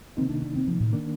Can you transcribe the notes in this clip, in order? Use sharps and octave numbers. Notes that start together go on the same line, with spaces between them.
C3 D#3 A#3 C4 D#4
D4
D4
C4
F3
A2
D#3 A#3 D4